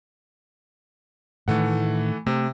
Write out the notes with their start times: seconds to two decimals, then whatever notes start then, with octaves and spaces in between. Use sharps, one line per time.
1.48 A2 D#3 E3 A3 F#5
2.27 C3 A3